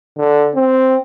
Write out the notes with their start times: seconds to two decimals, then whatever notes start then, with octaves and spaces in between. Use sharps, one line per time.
0.17 D3
0.55 C4